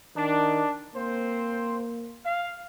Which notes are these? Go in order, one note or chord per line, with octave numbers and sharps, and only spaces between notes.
D#3 D4
A#3 C4 C5
F5